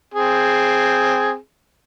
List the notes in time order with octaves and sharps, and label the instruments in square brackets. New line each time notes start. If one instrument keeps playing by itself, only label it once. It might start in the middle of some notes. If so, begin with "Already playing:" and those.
[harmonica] C4 G#4